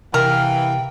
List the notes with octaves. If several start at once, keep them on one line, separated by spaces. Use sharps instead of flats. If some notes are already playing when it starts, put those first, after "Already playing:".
C3 E3 A#4 F5 G5